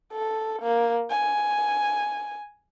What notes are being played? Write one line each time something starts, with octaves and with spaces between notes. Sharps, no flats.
A4
A#3
G#5